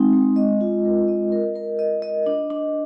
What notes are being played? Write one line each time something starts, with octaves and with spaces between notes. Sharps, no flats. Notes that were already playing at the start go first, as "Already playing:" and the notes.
Already playing: G#3 C4 D#4
G#3
D#5
F4
A#4
D#5
A#4
A#4
D#5
D#5
D4
D4